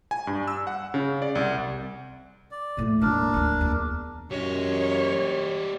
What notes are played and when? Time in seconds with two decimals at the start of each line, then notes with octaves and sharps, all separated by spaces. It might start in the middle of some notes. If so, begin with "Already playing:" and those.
0.11 G#5
0.27 G2
0.48 E6
0.67 F#5
0.94 C#3
1.22 D5
1.35 C2
2.51 D5
2.77 A2 A3
3.02 D#2 G#3 D4 A#4
3.34 D2 A#3
3.61 E2
4.31 F#2 G3 C#5 D#5